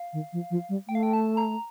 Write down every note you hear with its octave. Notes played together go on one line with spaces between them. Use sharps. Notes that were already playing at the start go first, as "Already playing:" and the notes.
Already playing: F5
D#3
F3
F3
G3
A3 G5
F5
G5
A5
A#5